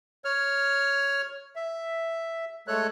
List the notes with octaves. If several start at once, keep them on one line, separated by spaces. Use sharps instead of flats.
C#5 F6
E5
G#3 A3 A4 C#5 F#6